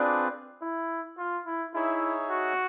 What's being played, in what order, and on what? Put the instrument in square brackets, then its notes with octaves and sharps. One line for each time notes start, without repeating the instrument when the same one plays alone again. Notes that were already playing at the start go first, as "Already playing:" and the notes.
Already playing: [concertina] C4 F4 G#4 B4 D5 [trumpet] D4
[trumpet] E4
F4
E4
[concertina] D#4 G#4 C#5 E5 [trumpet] E4
[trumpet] F#4